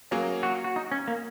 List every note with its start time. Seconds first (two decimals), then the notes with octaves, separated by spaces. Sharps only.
0.11 F#3 A#3 C#4 G#4
0.43 F#4
0.64 F#4
0.76 D#4
0.92 C#4
1.08 A#3